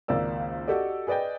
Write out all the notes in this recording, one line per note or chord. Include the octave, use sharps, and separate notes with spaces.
G#1 C#2 A#3 D5 E6
F#4 G4 A4 D5 D#5
G#4 B4 D5 D#5 G5